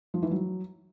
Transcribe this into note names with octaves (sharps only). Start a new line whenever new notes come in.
F3
E3
F#3